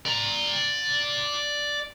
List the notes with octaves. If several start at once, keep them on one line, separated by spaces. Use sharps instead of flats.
D5 A#5